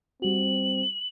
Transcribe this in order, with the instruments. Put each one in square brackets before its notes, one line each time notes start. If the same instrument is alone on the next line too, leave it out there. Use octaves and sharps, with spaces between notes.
[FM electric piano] G3 F#4 [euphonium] C4 [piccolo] F#7